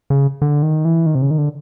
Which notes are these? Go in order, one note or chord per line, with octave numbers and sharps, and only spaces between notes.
C#3
D3
D#3
E3
D#3
C3
C#3
D#3
D3